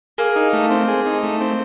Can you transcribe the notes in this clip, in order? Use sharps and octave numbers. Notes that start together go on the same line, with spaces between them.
A#3 G#4
D#4
A3
C4
G#4
D#4
A3
C4